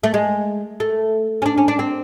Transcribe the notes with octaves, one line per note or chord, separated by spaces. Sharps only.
A3
G#3
A3
C#4
D4
C#4
D4
C4